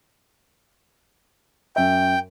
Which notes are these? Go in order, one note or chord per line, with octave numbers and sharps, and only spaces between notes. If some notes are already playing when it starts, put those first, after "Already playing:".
F#2 E5 G5